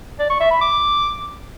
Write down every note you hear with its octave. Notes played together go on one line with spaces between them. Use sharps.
D5
C#6
E5
B5
D6